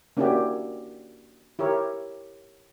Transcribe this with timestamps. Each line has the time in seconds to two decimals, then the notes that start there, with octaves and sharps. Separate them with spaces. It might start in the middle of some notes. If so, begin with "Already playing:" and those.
0.17 A#3 C#4 D4 E4 F#4 G4
1.59 E4 G4 A#4 C#5